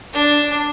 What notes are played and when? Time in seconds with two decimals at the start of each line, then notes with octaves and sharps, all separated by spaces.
0.13 D4